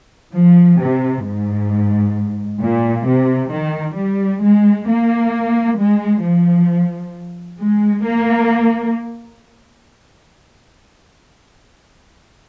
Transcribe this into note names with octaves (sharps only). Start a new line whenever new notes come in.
F3
C3
G#2
A#2
C3
D#3
G3
G#3
A#3
G#3
F3
G#3
A#3